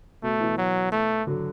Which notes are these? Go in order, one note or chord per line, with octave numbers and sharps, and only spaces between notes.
B2 A3
B2 E3
F#3
A3
D3 F#3